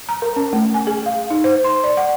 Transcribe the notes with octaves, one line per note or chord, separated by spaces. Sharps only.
A#5
A#4
C#4
A3
G#5
G#4
F5
D#4
C5
C6
D5
F#5